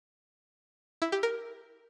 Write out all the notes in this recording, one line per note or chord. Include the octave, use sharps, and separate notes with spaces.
E4
G4
A#4